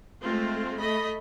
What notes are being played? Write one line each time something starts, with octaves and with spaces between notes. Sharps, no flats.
G#3 A3 C4 F4
A3 D#5 B5